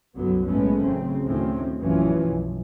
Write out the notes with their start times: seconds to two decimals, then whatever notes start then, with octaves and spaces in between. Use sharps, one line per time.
0.16 C2 F#2 D3 F#3 B3
0.45 B1 A2 G#3 A3 B3 C#4
0.80 A1 F#2 C#3 C4
1.23 D2 A2 D#3 C4 C#4
1.78 A#1 F#2 E3 F3 C#4
2.21 B1